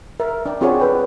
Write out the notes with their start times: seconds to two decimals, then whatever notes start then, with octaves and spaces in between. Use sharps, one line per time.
0.20 A#4 E5
0.46 D4 D5 G5
0.61 C4 F4 F#4 G#4 C#5 D5
0.80 A4 B4 G5